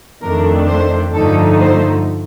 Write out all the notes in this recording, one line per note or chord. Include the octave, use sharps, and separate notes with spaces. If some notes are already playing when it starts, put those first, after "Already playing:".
F2 D#3 A3 D4 A#4
C5
G2 D3 F3 A3 D#4 A4
C5